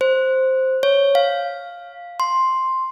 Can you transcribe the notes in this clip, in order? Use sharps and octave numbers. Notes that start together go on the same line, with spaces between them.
C5
C#5
F5
C6